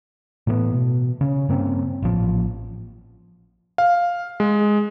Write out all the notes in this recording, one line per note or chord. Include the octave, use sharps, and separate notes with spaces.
A2 E3 A3 B3
B2
C#3 C#4
G2 A#3 C4 C#4
A1 A#2 F3
F5
G#3